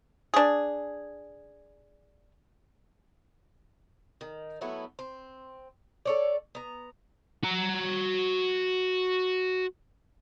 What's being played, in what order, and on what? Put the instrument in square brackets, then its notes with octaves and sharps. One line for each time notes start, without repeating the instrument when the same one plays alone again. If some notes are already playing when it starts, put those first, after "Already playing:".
[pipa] D4 G#4
[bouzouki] D#3
F#3 A3 B3 E4
C4
A4 C#5 D5
B3 A#5
[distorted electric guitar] F#4 A#5